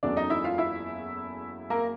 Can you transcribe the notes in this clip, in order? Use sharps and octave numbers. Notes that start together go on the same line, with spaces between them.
F#1 E2 C#3 F#3 A3 D4 D5
D#4 D#5
E4 E5
F4 F5
E4 E5
A#3 A#4